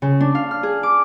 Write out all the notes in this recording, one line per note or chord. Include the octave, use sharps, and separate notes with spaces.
C#3
D4
F5
F6
G#4
D6